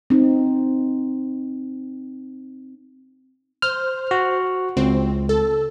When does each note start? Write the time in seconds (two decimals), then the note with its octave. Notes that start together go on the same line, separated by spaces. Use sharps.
0.10 C4 D#4
3.62 C5 F6
4.11 F#4
4.77 C#2 C4
5.29 A4